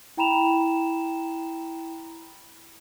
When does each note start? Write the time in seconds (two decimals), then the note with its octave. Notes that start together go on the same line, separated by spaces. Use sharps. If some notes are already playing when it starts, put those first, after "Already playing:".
0.17 E4 G5 A#5 B5 E7 F7